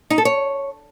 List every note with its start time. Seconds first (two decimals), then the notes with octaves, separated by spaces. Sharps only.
0.10 D#4
0.18 A4
0.25 C#5